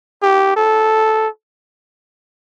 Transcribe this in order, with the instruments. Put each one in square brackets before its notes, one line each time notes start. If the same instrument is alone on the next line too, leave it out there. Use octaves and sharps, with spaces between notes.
[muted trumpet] G4
A4